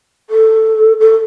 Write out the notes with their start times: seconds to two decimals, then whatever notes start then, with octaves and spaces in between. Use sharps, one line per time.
0.30 A4
1.00 A4